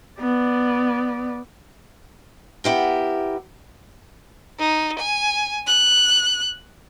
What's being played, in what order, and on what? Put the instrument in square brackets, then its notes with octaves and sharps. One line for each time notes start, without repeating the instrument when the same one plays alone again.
[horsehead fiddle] B3 D5
[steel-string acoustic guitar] B3 E4 G4 A#4
[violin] D#4
G#5
F#6